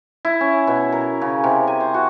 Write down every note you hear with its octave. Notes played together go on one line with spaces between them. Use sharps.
E4
C#4
B2
A#4
C#3
C3
G#5
C5
F#4